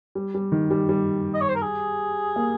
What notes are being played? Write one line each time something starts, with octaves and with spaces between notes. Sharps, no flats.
G3
G3
D#3
G3
G3
D#5
C#5
C5
A#4
G#4
A#3